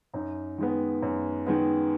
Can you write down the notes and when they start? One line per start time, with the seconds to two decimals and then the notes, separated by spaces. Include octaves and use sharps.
0.13 F#2 D#4
0.58 D#3 G#3 B3
1.02 F#2
1.47 D#3 G#3 B3